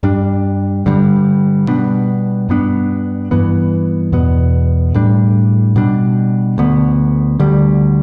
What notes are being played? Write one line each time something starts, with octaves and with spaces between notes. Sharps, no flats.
G2 G3 D4
G2 D3 G3
B2 G3 B3 D4
G2 G3 B3 D4
G2 E3 B3
E2 B2 B3
A2 G3 D4
B2 G3 D4
D2 D3 B3
D2 D3 G3